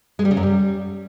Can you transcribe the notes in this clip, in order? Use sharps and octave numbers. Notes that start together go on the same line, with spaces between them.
G#3
G3
C#3
F#2
G3